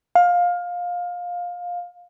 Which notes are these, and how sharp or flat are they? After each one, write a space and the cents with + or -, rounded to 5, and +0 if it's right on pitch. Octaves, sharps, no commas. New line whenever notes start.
F5 +20